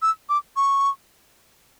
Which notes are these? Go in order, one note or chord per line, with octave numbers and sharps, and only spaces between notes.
E6
D6
C#6